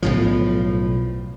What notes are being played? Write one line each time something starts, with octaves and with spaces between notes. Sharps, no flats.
B1 A2 F3